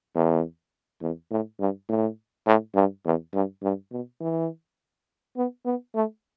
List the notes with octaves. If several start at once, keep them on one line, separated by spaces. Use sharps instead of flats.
E2
E2
A2
G2
A2
A2
G2
E2
G2
G2
B2
E3
B3
B3
A3